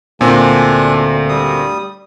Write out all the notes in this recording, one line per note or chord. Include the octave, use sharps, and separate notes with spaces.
D2 A#2 C4 D4 G#5
G3 D#6